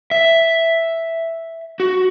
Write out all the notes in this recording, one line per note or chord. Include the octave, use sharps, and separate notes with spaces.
E5
F#4